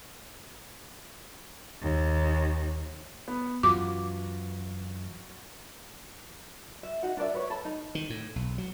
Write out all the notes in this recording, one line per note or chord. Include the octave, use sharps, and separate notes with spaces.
D#2
B3
F#2 E3 F4 F#4 D6
E5
D#4 F#4 F#5
D4 A#4 D5 E5
B4 C#5
A4 A5 B5
D#4
D#3
A2
B1
F#3